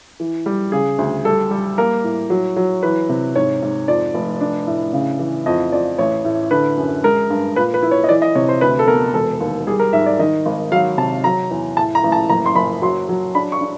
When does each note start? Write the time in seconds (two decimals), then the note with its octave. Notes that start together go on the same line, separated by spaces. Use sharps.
0.20 E3
0.46 G3
0.72 C#3 G#4
0.98 D2
1.25 G3 A4
1.51 G3
1.78 A#3 A#4
2.04 A2
2.30 F#3
2.57 F#3
2.83 E3 B4
3.09 C3
3.36 G#2 C#5
3.62 G#2
3.88 F2 D5
4.14 F1
4.41 D4
4.67 A2
4.93 C#3
5.19 E3
5.46 F2 D#5
5.72 F2 D5
5.98 A1 C#5
6.25 A2
6.51 D3 B4
6.77 F#2
7.03 G#3 A#4
7.30 G2
7.56 A#2 B4
7.74 B4
7.83 E4
7.91 C#5
8.04 D#5
8.09 E3 D5
8.22 D#5
8.35 C3 C#5
8.49 C5
8.61 D2 B4
8.79 A4
8.88 B3 A#4
9.14 E1 A4
9.41 D#2
9.67 G3 G#4
9.80 A#4
9.93 G#2 E5
10.06 D5
10.19 D#3 D#5
10.46 G#1
10.72 F#3 F5
10.98 C3 A5
11.24 F#3 A#5
11.51 E2
11.77 A2 A5
11.95 A#5
12.04 A1
12.12 A5
12.29 F#1 A#5
12.46 C6
12.55 F#1 B5
12.82 F#3 C6
13.09 F#3
13.35 D4 B5
13.52 C#6
13.61 D4